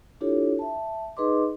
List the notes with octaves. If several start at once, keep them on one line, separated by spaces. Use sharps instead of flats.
D4 E4 F4 G4 A4 C#5
E5 A5
D#4 G#4 B4 D#5 C6 D6